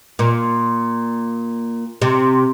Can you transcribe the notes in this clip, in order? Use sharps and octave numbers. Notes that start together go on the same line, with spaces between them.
A#2
C3